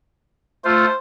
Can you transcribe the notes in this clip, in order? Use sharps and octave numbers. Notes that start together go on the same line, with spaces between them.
A3 F4 C5